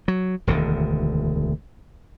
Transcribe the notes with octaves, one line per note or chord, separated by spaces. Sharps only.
F#3
E1 D2 D3 D#3